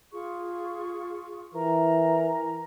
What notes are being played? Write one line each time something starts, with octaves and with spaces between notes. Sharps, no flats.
F4 G#4 C#6
E3 A#4 A#5